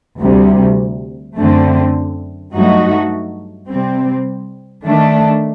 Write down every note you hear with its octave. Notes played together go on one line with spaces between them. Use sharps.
D2 C3 G3
F#2 D3 A3 C4
G2 F#3 A3 D#4 F#4
C3 G3 C4
D#3 A3 D4